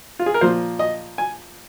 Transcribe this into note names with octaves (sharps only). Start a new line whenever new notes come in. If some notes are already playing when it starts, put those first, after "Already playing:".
F4
G#4
A#4
A#2 F3 A#3 C5
D#5
G#5